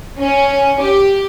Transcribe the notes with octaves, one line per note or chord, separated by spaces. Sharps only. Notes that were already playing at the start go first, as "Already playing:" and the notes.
C#4
G4